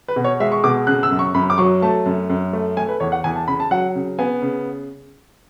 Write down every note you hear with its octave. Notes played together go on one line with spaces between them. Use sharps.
B4
B2
C#5
G#3 E5
C#6
B2 D6
C#3 F#6
E6
F#2
C#6
F#2 B5
D6
F#3 C#6
A3 A5
F#2
F#2
A3
A3 G#5
B4
E2 C#5
F#5
E2 G#5
A5
C#3 B5
A5
F#3 F#5
C#3
B3 G#5
C#3